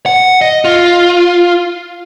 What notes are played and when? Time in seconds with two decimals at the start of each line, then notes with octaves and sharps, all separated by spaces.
0.06 F#5
0.41 D#5
0.65 F4